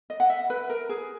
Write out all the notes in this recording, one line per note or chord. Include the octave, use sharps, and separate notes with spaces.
D#5
F#5
E5
B4
A#4
G#4